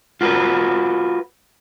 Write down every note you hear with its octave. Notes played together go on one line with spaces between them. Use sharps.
F4 F#4 A#4 B4